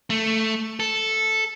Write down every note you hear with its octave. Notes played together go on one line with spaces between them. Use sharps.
A3
A4